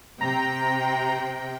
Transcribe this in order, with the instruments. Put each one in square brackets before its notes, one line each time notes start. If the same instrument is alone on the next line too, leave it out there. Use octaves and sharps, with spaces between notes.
[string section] C3 G5 [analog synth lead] A#5